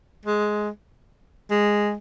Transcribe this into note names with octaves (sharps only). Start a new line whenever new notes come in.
G#3
G#3